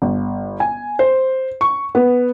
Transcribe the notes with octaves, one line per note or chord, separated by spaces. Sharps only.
G1
G#5
C5
C#6
B3